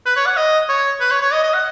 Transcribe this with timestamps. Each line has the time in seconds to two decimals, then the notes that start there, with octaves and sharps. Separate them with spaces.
0.06 B4
0.16 C#5
0.27 F#5
0.37 D#5
0.69 C#5
1.01 B4
1.11 C#5
1.22 C#5
1.32 D#5
1.43 D#5
1.54 F#5